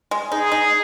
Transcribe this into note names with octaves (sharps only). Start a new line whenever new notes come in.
G#3
D#4 G#4
D#4